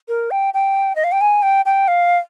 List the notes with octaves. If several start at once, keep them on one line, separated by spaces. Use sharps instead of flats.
A#4
G5
G5
D#5
F5
G5
G#5
G5
G5
F5